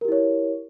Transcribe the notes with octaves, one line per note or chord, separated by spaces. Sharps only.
E4 G4 A#4 C#5